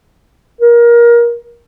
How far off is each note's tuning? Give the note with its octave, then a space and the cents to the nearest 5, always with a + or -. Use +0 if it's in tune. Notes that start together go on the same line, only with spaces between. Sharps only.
A#4 +20